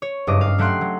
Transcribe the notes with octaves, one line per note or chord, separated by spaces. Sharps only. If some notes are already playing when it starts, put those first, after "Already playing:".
C#5
F#1 G2 D#5 D6
F5
F#3 A3 F#5 G5 C6 F#6
F#3